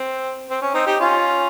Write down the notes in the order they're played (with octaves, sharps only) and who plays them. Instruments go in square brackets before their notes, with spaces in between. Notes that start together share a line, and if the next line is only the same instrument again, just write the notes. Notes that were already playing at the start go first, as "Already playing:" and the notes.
Already playing: [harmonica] C4
C4
C#4
C4 D#4
D#4 G4
C#4 F4